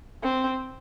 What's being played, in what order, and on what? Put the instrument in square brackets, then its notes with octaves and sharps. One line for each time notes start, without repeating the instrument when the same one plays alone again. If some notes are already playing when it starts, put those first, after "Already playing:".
[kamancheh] C4